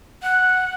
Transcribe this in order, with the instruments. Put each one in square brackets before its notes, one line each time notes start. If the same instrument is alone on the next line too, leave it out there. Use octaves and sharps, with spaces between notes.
[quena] F#5